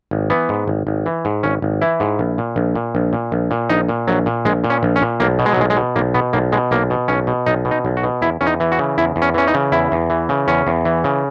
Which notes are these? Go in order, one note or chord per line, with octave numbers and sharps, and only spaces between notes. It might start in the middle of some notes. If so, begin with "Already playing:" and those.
G#1
E3 B3
G#2
G#1
G#1
E3
G#2
G#1 C#4
G#1
E3 E4
G#2
A#1
A#2
A#1
A#2
A#1
A#2
A#1
A#2
A#1 D#4
A#2
A#1 F#3
A#2
A#1 G#3
A#2
C#4
A#1
C#4
A#2
B1 A#3
B2
G#3
F#3
B1 G#3
G#3
B2
B1 A#3
B2 B3
B1 A#3
B2 G#3
B1 A#3
B2
B1 C#4
B2
B1 D#4
B2
D#4
B1
F#4
B2
E2 E4
E2 C#4
D#4
E3
F#4
C#3
E2 E4
E2
C#4
E3 C#4
D#4
C#3
E2 E4
E2
E3
C#3
E2 C#4
E2
E3
C#3